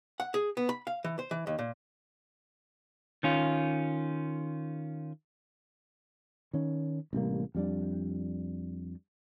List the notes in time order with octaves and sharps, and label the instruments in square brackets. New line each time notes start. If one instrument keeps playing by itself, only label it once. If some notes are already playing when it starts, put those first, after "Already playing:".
[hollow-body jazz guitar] F#5
G#4
B3
B5
F5
E3
C5
E3
D#2
A#2
[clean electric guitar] D#3 C#4 F4
[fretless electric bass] D#3 C#4
A1 C3 G3 A#3
F2 G3 D4